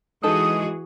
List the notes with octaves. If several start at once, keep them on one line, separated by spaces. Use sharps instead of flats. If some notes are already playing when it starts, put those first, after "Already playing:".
E3 G#3 D#4 F#4 G#4 A4 D#6